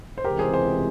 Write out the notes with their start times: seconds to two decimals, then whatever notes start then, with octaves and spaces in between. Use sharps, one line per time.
0.18 C5
0.24 C#2 C3 E3 G#3 C4 G4 A#4
0.39 G#4 C5
0.54 G#4 C5